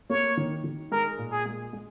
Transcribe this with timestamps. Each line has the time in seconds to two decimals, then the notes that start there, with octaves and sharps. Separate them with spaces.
0.10 A#3 C#5
0.37 D#3
0.64 D#3
0.91 G#3 A#4
1.18 A#2
1.32 G#4
1.45 G#3
1.73 G#3